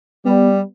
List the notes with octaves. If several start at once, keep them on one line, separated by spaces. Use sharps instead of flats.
G3 B3